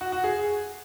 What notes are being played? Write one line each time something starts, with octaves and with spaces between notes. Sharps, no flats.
F#4
F#4
G#4